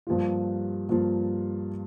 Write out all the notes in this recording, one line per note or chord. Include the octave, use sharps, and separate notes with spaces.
G2 F3 A#3 F4
G2 F3 A#3 F4